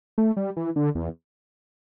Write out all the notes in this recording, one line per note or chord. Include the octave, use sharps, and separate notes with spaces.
A3
G3
E3
D3
E2